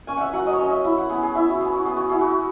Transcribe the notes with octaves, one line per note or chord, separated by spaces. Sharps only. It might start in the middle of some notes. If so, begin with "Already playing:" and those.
C#4 G#5
E5 F#5
F#3 F#5
D#5
C#5
C#4 D#5
E5
E4 E5
F#5
B3 G#4
G#4
E4 E5
F#4
B3 G#4
F#4
B3 G#4
F#4
E4 G#4
F#4